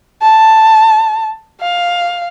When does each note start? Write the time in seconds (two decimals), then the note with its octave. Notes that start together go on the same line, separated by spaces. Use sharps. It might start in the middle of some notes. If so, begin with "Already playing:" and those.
0.22 A5
1.61 F5